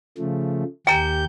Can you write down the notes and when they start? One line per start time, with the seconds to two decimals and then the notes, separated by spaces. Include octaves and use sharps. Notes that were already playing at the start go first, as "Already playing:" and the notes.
0.18 C#3 F3 A3
0.87 D#2 G4 G5 G#5 A#5 G6